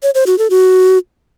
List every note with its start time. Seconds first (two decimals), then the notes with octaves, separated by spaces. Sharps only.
0.03 C#5
0.15 C5
0.27 F#4
0.38 A4
0.50 F#4